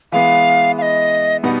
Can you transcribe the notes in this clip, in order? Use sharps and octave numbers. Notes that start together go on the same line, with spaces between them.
E3 G#3 B3 F5
F5
D#5
B2 G3 B3 D#4 F#5